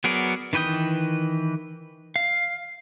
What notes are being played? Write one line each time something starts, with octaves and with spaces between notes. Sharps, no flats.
F#3 B3 G#4 A#4 D5
D#3 E3 B4 G5 D#6
F5